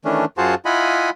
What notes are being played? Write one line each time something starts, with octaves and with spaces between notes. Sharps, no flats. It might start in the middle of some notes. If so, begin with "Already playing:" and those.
D#3 E3 A3 C#4 D4
F#2 F4 F#4 G#4 C5 A5
E4 F4 D#5 F#5 G#5 B5